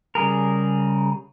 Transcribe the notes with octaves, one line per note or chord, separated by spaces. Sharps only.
C#3 G3 G#4 A#4